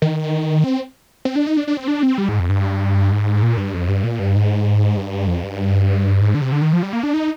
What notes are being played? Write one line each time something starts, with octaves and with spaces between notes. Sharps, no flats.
D#3
C4
C4
D4
D#4
D4
D4
C4
D4
C4
G3
G#2
F2
G2
G#2
A#2
G2
F2
G2
A#2
G2
G#2
G2
F2
G2
G#2
D3
C3
D3
D#3
F3
G3
A#3
D4
D#4